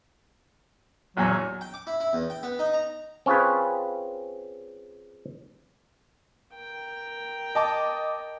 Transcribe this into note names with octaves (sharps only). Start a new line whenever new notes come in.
A#1 E2 F#3 G#5
G5
D6
E4
E4
E2
G5
B3
D#4
A#5
C4 C#4 F4 G#4 B4
A#4 G5
D#5 A5 D6